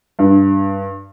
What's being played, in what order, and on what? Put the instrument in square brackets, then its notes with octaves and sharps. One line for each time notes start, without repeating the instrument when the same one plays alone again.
[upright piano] G2